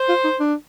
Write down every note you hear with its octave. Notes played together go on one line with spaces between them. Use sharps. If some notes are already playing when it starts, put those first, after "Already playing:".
Already playing: C5
F4
D#4
D4